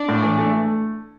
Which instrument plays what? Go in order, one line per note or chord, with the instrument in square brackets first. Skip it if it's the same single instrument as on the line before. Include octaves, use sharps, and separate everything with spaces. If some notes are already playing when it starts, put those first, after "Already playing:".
Already playing: [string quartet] D4 D5
[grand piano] A2
E3
A3
A3